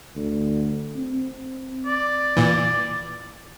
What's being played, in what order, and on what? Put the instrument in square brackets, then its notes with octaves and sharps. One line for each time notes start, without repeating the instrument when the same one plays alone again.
[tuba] D2
C4
[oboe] D5
[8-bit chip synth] A#2 E3